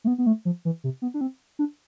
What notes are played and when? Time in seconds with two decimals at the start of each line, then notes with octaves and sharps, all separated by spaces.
0.04 A3
0.07 B3
0.18 B3
0.26 A3
0.45 F3
0.65 E3
0.84 C3
1.02 B3
1.14 D4
1.21 C4
1.59 D4